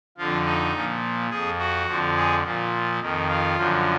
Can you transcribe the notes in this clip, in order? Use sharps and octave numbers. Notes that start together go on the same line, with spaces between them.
F2 D3 F3 F4
D#4
A#2 F3
F2 F3 G#4
F#4
F2 D3 F3
G#4
A#2 F3
F2 D#3
F4
F#2 D3 F3